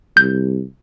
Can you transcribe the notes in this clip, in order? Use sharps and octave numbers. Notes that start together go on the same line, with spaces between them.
C2 G6